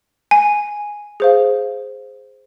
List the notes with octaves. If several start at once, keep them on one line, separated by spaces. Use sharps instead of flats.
G#5
G#4 C5 F5